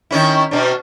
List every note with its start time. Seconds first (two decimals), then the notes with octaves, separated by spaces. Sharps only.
0.11 D#3 C#4 E4
0.51 B2 C#4 D4